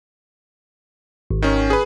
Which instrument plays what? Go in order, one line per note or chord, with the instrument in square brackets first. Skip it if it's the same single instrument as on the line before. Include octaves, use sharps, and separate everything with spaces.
[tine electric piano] G#1
[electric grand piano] D#3 C#4
G#4 B4